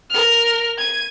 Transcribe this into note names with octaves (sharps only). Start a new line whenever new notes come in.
A#4 F6
G#6 D#7